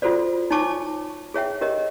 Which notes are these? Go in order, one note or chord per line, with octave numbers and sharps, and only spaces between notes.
F4 F#4 A4 C5 D5
D#4 C#5 G#5 A5 C#6 D6
G#4 C#5 E5 G5
G4 A#4 C#5 D#5